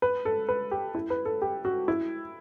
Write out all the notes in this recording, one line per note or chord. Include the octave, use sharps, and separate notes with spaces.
B4
A4
B4
G4
E4
B4
A4
G4
F#4
E4